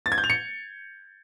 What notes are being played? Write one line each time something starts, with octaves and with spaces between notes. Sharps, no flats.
A6
G#6
G6
F7
C#7